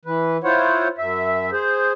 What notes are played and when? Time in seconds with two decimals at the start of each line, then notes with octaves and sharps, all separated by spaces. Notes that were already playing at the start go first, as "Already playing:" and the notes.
0.05 E3 B4
0.44 E4 F4 C5 C#5 F#5
0.98 F#2 E5
1.52 G#4 C5